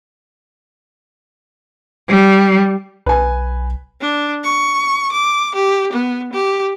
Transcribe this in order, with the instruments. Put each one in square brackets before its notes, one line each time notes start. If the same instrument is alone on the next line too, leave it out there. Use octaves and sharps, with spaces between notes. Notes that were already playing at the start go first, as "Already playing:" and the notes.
[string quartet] G3
[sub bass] B1 [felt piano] B4 G#5
[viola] D4
C#6
D6
G4
B3
G4